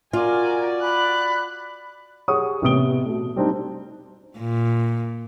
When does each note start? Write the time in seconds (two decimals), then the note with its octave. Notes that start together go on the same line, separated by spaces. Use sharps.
0.13 F4 F#4 A#4 D5 G#5
0.81 B5 F#6
2.28 G4 G#4 C#5 F#5 C#6 D#6
2.62 A1 C3 B3 D#6 D7 G7
3.06 B2 A3
3.36 G3 C4 D4 D#4
4.39 A#2